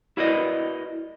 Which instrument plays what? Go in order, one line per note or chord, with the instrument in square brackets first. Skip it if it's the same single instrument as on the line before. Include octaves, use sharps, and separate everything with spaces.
[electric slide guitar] E4 F#4 A#4 B4 D5 D#5